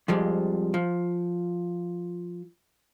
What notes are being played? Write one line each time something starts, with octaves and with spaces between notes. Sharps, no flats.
F2 F3 G3 G#3
F3